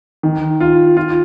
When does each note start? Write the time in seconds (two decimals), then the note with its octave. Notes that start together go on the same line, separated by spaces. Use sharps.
0.23 D#3
0.60 F4
0.97 F4